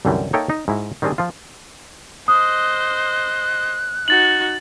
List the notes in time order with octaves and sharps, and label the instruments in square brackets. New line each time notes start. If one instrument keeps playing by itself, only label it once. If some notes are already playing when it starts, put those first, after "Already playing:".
[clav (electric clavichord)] C2 F#2 D3 E3 F#3 G3
A#3 D#4 A4 C#5 E5 G5
D#4
G#2 E4 F#4
D#3 G3 C4 D4 G#4
F3 F4
[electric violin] C5 D#5 [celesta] D#6 [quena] F#6
[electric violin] D#4 F#4 [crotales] A6 F#7